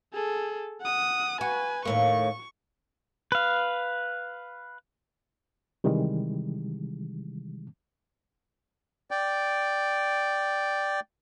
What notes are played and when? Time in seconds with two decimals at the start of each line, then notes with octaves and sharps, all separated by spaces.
0.13 G#4 A4
0.82 F#5 D#6
1.41 F#4 B4 G#5
1.85 D#2 A2 A#3 C#6
3.32 B4 F5
5.84 C3 D#3 E3 G3 G#3
9.11 D5 G5